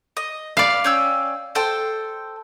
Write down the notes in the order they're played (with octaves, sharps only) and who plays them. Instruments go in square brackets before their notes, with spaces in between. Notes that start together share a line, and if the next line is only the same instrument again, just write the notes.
[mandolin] D#5
[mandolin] B4 [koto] D5 F5
[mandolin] C#4 G5 E6
A4 C5 G5